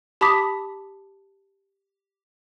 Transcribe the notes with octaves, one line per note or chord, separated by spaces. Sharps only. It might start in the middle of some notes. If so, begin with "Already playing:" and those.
G4 A5 B5 D6 D#6 B6